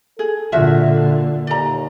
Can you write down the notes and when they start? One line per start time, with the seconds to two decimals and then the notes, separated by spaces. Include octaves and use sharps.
0.19 G#4 A4
0.52 A#2 D3 F4 F#4 E5
1.47 D#2 D5 A#5